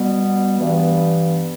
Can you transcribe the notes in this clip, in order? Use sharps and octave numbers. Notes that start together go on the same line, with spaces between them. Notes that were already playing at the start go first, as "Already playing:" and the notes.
Already playing: B2 G3 B3
G2 E3 B3